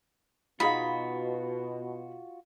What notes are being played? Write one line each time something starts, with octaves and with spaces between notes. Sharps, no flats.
B2 D#4 F4 F#4 G#4 F5 B5